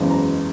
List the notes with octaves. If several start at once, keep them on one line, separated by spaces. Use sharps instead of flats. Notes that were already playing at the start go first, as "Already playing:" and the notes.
Already playing: F#1 E2 C#3 E3 G#3
A#5